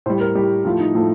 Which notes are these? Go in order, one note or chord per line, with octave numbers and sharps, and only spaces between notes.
A2 G3 C5
A#4
A2 G3 G4
A2 F3 A3 F4
D#4
A2 F3 A3